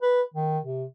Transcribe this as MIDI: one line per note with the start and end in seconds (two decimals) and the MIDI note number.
0.02 0.21 71
0.34 0.58 51
0.64 0.84 48